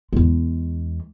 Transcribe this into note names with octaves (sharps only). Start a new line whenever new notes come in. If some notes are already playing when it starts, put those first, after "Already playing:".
E2 G#3